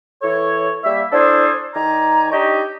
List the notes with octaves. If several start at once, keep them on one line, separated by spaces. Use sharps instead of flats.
E3 A4 C#5
G3 A#3 E5
D4 E4 G#4 A4 C5
D#3 D5 G#5 A#5
D4 D#4 G4 C#5 D#5